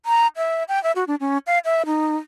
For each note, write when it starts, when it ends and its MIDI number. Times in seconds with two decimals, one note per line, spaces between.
0.06 0.27 82
0.36 0.63 76
0.68 0.82 79
0.83 0.92 76
0.95 1.04 66
1.07 1.15 62
1.20 1.38 61
1.47 1.59 77
1.65 1.83 76
1.86 2.16 63